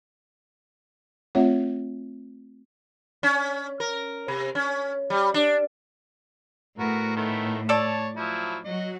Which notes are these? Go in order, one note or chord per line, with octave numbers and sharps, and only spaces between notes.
A3 C4 F4 C#5 E5 F#5
C#4
A#4
C3
C#4
G3
D4
A2 B3 F#4 A#4
D#3 A3 B3
A4 C#5 D5 A5
F3 F#3 E4
F#3 F#4 D#5